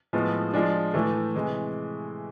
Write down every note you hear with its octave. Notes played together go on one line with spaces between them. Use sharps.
A2 F3 G#3 B3
F3 G#3 D4
A2 E3 A3
C3 E3 G#3